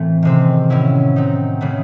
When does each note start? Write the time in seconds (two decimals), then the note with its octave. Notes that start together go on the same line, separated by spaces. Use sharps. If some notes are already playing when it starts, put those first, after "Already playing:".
Already playing: A2 E3 A3 C4
0.23 C3 D#3 G#3 C4
0.70 A2 F#3 C#4 E4
1.16 F#3 C4 D#4
1.61 C#3 E3 A3